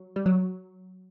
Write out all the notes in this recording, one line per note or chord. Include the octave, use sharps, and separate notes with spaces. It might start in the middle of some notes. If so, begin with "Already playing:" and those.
Already playing: F#3
G3
F#3